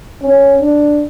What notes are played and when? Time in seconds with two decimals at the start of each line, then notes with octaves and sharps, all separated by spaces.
0.22 C#4
0.60 D4